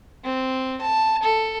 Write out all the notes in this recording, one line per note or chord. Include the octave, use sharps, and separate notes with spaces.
C4
A5
A4